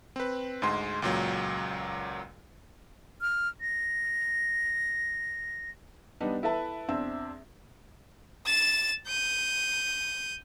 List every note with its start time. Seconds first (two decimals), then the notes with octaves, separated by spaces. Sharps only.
0.16 C4 B4
0.62 D2 G#2 G#3 C6
1.02 C#2 A#2 F#3
3.21 F6
3.61 A#6
6.20 G3 B3 D4 D#4
6.43 E4 A4 B4 E5 A5 B5
6.88 E2 C4 D4 E5 E6
8.46 A6 E7
9.08 G6 D#7